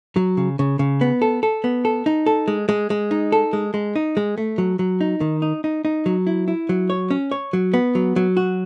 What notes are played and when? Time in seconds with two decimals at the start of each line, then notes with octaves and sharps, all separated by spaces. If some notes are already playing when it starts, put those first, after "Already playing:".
0.16 F#3
0.37 C#3
0.59 C#3
0.79 C#3
1.01 B3
1.22 A4
1.43 A4
1.64 B3
1.85 A4
2.06 D#4
2.26 A4
2.48 G#3
2.69 G#3
2.90 G#3
3.11 D#4
3.32 A4
3.53 G#3
3.74 G#3
3.96 D#4
4.17 G#3
4.38 A3
4.58 F#3
4.79 F#3
5.01 D#4
5.21 D#3
5.42 D#4
5.64 D#4
5.85 D#4
6.06 F#3
6.27 E4
6.48 E4
6.69 F#3
6.90 C#5
7.11 C#4
7.31 C#5
7.53 F#3
7.74 B3
7.95 F#3
8.16 F#3
8.37 F#4